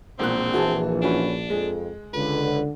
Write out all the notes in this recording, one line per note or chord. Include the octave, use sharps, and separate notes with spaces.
E1 A#1 A#2 C4 F#6
E3 F#4 G#4 A5
C#4 D4 F#4 B4
F2 G#3
C#2 D3 B4